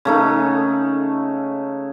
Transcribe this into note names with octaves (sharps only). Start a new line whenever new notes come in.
C#3 A3 D#4